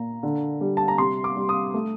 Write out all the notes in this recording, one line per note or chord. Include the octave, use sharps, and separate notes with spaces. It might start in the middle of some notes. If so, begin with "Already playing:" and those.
Already playing: A#2 A#5
D3
G3
A5
A#5
C3 C6
D6
G3
D#6
A3